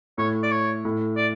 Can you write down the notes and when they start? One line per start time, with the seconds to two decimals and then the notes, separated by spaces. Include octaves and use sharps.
0.18 A2 C#5
0.43 D5
0.51 C#5
0.85 A2
1.17 D5